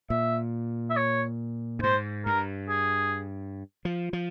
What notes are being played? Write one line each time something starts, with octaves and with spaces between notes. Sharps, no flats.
A#2 E5
E5
C#5
G2
G#2 C5
G2 A#4
G#4
F3
F3